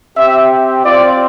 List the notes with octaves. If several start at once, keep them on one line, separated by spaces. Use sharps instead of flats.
C4 G4 E5
C4 F4 D5